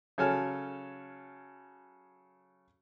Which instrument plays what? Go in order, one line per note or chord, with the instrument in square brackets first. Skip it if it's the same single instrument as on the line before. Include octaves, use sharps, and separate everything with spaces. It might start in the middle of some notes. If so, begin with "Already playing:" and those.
[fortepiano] C#3 F#3 A4 C#5 G#5 F6